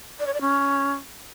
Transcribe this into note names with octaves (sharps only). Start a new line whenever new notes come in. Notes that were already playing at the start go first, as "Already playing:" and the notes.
D5
C#5
D5
C#4